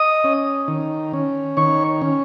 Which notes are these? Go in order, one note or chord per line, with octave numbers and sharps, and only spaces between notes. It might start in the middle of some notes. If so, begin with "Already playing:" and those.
Already playing: D#5 D#6
C#4
D#3
C#4
D#3 C#5 C#6
C#4